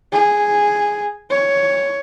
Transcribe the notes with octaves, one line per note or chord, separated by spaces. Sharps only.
G#4
C#5